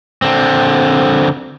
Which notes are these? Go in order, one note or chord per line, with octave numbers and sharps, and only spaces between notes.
D3 C4